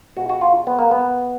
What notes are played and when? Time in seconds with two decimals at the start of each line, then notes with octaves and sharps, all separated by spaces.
0.17 B2 G#3 F#4
0.29 F#4
0.41 F4
0.67 B3
0.79 A#3
0.91 B3